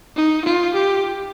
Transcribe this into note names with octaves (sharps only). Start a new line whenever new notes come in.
D#4
F4
G4